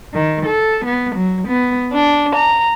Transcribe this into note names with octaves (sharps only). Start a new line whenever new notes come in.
D#3
A4
B3
F#3
B3
D4
A#5